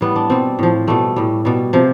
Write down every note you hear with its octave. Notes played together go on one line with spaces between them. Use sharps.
A2 G3 B3
D4
B2 G3 C4
A2 F3
B2 G3 A3
A2 G3
B2 G3
C3 F3